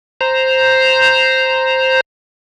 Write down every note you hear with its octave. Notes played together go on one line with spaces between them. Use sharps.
C5 A#5